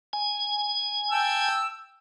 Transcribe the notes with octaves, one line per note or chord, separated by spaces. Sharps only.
G#5
G5 A5 E6